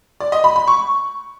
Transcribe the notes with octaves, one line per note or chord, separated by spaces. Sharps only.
D5
D#5
B5
B5
C#6